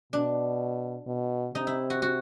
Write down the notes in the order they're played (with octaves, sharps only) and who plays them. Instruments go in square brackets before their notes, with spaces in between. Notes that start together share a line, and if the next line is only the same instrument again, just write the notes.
[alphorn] B2 [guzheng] D4
[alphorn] B2
[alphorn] C3 [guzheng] D#4
[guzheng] E4
F#4
F#4